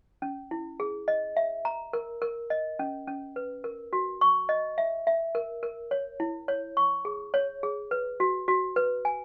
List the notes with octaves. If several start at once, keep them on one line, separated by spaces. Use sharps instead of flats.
C#4
E4
G#4
D#5
E5
A#5
A#4
A#4
D#5
C#4
C#4
B4
A#4
F#4
C#6
D#5
E5
E5
A#4
A#4
C#5
E4
C#5
C#6
G#4
C#5
G#4
B4
F#4
F#4
B4
G#5